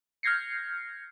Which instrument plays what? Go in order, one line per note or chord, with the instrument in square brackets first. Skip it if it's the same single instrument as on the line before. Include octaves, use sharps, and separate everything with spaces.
[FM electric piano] F6 G6 G#6 A#6 C7 C#7